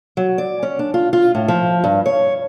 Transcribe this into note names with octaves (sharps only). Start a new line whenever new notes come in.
F#3
D5
C#4
D4
F4
F4
A2
F3
G2
C#5